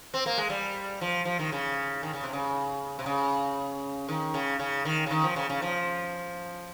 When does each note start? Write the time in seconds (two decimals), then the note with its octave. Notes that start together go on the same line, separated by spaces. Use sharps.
0.14 C4
0.26 A#3
0.38 G#3
0.50 G3
1.01 F3
1.25 F3
1.39 D#3
1.52 C#3
2.03 D#3
2.14 C#3
2.23 C3
2.33 C#3
2.99 C3
3.06 C#3
4.09 D#3
4.34 C#3
4.59 C#3
4.85 D#3
5.06 C#3
5.11 D#3
5.24 F3
5.36 C#3
5.50 C#3
5.62 F3